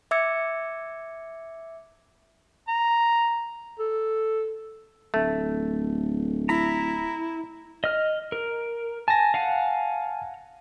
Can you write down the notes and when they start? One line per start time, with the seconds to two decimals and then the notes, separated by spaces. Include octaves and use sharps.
0.11 E5 D6 E6 G#6 C#7
2.68 A#5
3.79 A4
5.14 D1 A3
6.49 E4 A#5 B5
7.84 D#5 F6
8.32 A#4
9.08 G#5 A5 A#6
9.34 F5 F#5 G#5